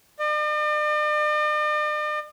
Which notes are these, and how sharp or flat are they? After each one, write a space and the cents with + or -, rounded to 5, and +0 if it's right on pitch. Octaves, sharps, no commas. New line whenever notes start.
D5 +45